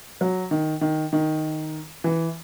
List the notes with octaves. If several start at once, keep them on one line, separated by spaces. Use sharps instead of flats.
F#3
D#3
D#3
D#3
E3